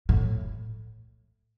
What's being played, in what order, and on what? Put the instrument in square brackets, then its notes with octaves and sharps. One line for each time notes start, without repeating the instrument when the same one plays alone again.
[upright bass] A2